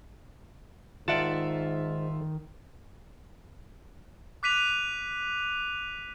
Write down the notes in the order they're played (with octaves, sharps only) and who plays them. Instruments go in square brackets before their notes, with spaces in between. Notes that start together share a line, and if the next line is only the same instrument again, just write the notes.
[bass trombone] G#2 [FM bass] D#3 [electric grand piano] F4 E5 [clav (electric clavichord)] D5 F#5 A5
[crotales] D6 F#6 B6 D#7 F7